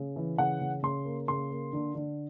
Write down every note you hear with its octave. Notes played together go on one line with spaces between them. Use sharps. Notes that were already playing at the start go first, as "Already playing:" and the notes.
Already playing: C#3
E3
C#3 F#5
C#3
C#3 C6
A#3
C#3 C6
A#3
D3
D3